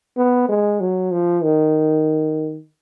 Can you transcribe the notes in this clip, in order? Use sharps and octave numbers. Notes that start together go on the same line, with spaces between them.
B3
G#3
F#3
F3
D#3